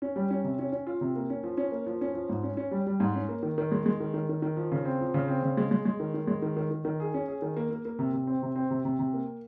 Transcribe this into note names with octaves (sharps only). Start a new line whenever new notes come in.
C#4
G3
C#4
C3
C#4
C#4
F4
C3
A#3
C#4
F3
C#4
A#3
F3
C#4
F3
G#2
C#4
C#4
G3
G3
G#2
C#4
A#3
D#3
D#3
G#3
G#3
D#3
D#3
D#3
D#3
F3
C#3
C4
F3
C#3
C4
C#3
G#3
G#3
G#3
D#3
D#3
G#3
D#3
D#3
D#3
D#3
G#4
C#4
G#4
D#3
A#3
A#3
A#3
C3
C3
C4
C3
C4
C3
C3
C3
A#3